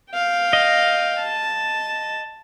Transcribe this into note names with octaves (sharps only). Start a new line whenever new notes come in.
F5 G5
D#5
A5